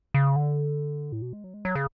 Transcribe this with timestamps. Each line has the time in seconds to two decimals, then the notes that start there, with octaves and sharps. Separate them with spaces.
0.14 C#3
0.36 D3
1.12 A2
1.22 B2
1.33 G#3
1.44 F#3
1.54 G#3
1.65 F#3
1.75 C#3